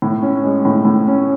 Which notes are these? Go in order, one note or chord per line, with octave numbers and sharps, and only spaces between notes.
A2
C#4
G#3
A2
A2
C#4